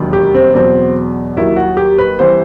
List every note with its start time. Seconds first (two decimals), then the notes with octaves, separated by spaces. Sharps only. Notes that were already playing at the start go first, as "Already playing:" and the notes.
Already playing: E1 D#2 D#3 F#3
0.13 G4
0.34 C4
0.54 E2 B2 F#3 C4
1.36 D#2 D#3 F#3 E4
1.56 F#4
1.77 G4
1.98 B4
2.19 C2 C3 E3 C5